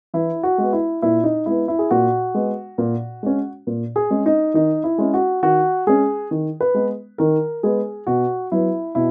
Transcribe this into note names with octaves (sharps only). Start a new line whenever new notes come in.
E3 E4
F#4
G#3 B3
E4
A#2 E4
D#4
G#3 B3 E4
E4
G#4
A#2 F#4
G#3 B3
A#2
G#3 C#4
A#2
G#4
G#3 C#4
D#4
D#3 D#4
E4
G#3 C#4
F#4
D#3 F#4
G#3 C#4 G#4
D#3
B4
G#3 B3
D#3 A#4
G#3 B3 G#4
B2 F#4
F#3 B3 E4
B2 E4